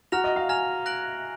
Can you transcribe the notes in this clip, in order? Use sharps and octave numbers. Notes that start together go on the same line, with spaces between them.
F#4 A#5 F6 A#6 F7
D#5
F5
G#5 A#5 F6 A#6 F7
F#6 A#6 D7 F#7